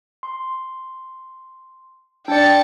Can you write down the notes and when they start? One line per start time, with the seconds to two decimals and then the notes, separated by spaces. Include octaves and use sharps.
0.23 C6
2.28 D4 D5 G5 A6 C#7